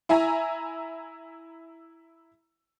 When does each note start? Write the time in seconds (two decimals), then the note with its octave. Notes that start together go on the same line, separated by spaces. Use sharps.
0.09 E4 E5 G#5 A#5